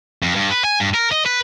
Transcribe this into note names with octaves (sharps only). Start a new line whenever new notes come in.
F2
G2
B4
G#5
G2
A#4
D#5
B4